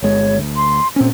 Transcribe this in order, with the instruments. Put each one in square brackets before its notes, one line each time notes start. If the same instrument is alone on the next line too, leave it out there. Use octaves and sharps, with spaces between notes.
[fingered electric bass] G1 G#3 [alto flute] C#5
[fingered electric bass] D2
[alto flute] C6
[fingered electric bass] A#2 C#4 [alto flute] C4